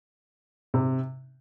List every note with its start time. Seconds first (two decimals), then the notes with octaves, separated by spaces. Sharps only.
0.74 C3